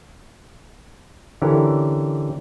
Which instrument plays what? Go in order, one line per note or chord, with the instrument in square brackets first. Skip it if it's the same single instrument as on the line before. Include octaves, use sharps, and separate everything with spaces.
[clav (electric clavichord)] D3 E3 C#4 G4 A#4